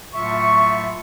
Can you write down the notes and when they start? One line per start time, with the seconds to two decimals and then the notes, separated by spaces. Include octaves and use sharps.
0.14 A2 F#3 A3 F4 E5 C#6